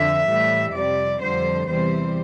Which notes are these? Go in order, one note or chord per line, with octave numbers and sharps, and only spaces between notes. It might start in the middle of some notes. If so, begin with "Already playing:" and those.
Already playing: F2 D3 F3 E5
A2 E3 G3
F2 C3 G3 D5
F2 D3 G3 C5
E2 C3 E3 G3 C5